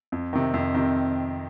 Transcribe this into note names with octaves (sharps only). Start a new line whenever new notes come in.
F2
C3 D#3
F2
C3 D#3